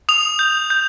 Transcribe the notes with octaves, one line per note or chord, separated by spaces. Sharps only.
D#6 F7
G6
G6